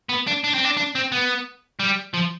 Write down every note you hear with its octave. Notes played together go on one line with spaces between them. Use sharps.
B3
D4
D4
C4
D4
D4
C4
B3
G3
F3